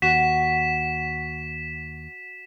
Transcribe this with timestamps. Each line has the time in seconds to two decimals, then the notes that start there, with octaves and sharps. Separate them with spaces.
0.02 D#2 F#4 B6 E7